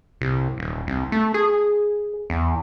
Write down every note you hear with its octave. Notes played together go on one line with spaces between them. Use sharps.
C2
D#1
C2
A3
G#4
E2